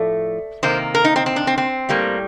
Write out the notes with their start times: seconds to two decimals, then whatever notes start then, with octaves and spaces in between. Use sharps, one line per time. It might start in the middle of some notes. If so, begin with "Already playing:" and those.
Already playing: A2 F3 A3 D5
0.63 C3 D#3 A#3 C5
0.95 A#4
1.05 D#4
1.16 C4
1.26 C4
1.36 D4
1.47 C4
1.58 C4
1.89 A2 G3 A#3